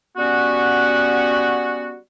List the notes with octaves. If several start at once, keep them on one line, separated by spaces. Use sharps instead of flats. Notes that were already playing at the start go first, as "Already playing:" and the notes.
G3 B3 C#4 F#4